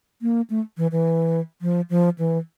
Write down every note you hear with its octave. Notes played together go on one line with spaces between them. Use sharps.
A#3
A3
E3
E3
F3
F3
E3